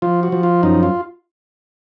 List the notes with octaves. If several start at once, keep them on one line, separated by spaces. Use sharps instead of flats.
F3 F4
F#4
F3
F4
F#2 D#4
F4